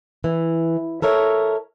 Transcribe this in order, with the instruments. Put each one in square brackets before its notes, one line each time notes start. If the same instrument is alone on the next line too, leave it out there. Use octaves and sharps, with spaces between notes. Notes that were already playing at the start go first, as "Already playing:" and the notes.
[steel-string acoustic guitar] E3
A4 A#4 C#5 E5